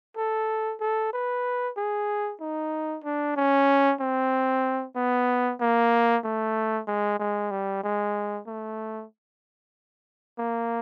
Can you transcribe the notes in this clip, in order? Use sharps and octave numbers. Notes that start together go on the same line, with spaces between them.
A4
A4
B4
G#4
D#4
D4
C#4
C4
B3
A#3
A3
G#3
G#3
G3
G#3
A3
A#3